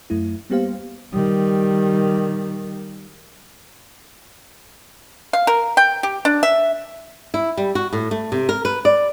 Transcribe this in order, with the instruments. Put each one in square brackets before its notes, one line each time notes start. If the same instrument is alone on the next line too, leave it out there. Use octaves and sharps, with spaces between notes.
[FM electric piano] F#2 A3 E4
G3 A#3 B3 G4 C5 F5
[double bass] D#3 G3
[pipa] F5
A#4
G5
G4
D4
E5
[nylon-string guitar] E4
G3
F#4
A2
A3
C3
A#4
B4
D5